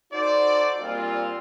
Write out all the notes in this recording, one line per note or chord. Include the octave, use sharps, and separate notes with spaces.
D#4 F#4 A4 C5 D5
A#2 G3 C4 F4